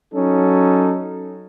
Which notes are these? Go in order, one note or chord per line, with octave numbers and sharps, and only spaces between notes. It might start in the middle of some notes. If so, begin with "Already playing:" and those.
F#3 C#4 D#4 A4